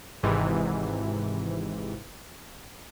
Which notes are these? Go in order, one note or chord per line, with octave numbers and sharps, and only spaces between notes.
G#1 G#2 C3 E3